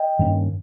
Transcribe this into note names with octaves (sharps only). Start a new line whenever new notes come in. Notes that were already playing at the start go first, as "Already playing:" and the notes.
Already playing: D#5 G5
G2 D#3 A#3 C#4